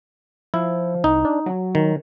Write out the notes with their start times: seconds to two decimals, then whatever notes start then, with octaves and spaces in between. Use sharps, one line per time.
0.54 F3 E4
1.04 C2 D#4
1.25 D4
1.46 F#3
1.75 D#3